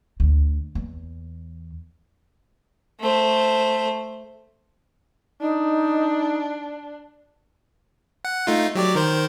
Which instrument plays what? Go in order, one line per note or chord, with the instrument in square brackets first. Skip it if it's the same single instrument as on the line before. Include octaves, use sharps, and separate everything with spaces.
[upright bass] D2
E2
[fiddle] A3 C5
[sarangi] D4 [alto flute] D#4
[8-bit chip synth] F#5
A3 D#4 F4
F#3 G4 D5
D#3 A#4 C5